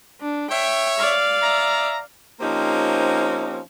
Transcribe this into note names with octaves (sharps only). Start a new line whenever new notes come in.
D4
C#5 E5 G5
D5 F5
E5 A#5
F3 A#3 C4 C#4 D#4 G4